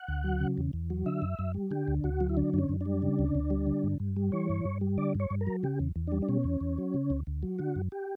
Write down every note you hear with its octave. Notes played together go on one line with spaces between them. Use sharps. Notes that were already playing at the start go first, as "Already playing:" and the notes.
Already playing: F#5
D2
F#3
C#3
E2
E2
F#3
D3 E5
F#2
F#2
G3
D3 G4
D2
D2 F#4
F#3
E4
D3 D4
F#2 C#4 D4
F#2
G3 D4
C#3
D2
D2
G3
D3
G2
G2
G3
E3 C#5
G2
G2
G3
D3 D5
G2
C#5
G2
A#4
F#3
C#3 G4
E2
E2
G3 D4
D4
B2 C#4
E2
E2
F#3
C#3
D2
D2
F#3
D3 F#4
F#2
G4